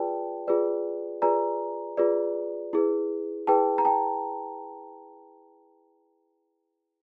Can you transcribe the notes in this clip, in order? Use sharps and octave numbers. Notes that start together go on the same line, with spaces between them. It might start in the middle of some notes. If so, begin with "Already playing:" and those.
Already playing: F4 G#4 B4 D5 G5 A5
F4 G#4 B4 D5
F4 G#4 B4 D5 G#5 A#5
F4 G#4 B4 D5
E4 G#4 B4
E4 G#4 B4 G5 A5
A#5
G5 A5